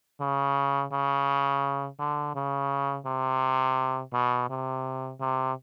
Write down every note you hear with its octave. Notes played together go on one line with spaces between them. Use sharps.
C#3
C#3
D3
C#3
C3
B2
C3
C3